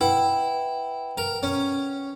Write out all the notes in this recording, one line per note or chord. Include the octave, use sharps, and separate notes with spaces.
E4 B4 F#5 G5
A#4
C#4